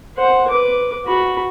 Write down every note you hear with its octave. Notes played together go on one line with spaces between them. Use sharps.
C5 F#5
B4 D6
F#4 B5